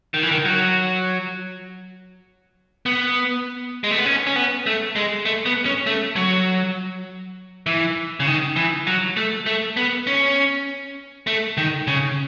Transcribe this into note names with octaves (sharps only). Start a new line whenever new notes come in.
D#3
E3
D#3
F#3
B3
G#3
A3
B3
C#4
C#4
B3
A3
G#3
A3
B3
C#4
A3
F#3
E3
C#3
D#3
E3
F#3
A3
A3
B3
C#4
A3
D#3
C#3